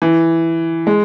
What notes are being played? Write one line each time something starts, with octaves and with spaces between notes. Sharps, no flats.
E3
G#3